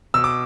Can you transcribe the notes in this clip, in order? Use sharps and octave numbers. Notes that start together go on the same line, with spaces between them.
B2 E6
D6